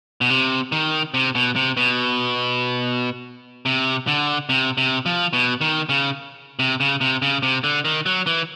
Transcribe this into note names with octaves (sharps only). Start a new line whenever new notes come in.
B2
C3
D#3
C3
B2
C3
B2
C3
D3
C3
C3
F3
B2
D#3
C#3
C3
C#3
C3
C#3
C3
D3
D#3
F#3
E3